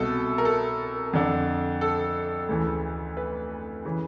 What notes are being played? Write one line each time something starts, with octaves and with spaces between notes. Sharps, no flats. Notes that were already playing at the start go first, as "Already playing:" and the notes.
Already playing: C2 B2 A4
A#4
A4
F2 D3
A4
D2 C#3 E3
B4
C#3 E3